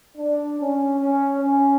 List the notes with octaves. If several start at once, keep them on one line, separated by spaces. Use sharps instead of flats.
D4
C#4
C#4
C#4